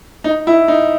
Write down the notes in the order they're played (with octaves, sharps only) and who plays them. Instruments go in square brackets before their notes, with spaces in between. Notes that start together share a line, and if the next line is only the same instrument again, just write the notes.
[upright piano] D#4
E4
D#4